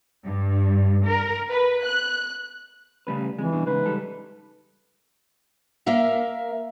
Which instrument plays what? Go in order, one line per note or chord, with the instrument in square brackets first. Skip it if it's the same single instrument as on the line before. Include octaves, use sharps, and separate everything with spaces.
[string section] G2
A#4
B4
F#6
[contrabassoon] A1 [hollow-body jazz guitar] C#3 G3 B4
[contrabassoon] F2 [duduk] E3 [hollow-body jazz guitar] G#3
[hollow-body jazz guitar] E2 B2 [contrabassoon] G2
[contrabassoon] G#2 [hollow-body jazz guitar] C#3 [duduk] B4
[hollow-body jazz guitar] G3 A4
[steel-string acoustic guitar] A#3 A#4 E5 F5